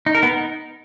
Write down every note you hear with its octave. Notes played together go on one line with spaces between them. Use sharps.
D#4
A#4
B3
D#4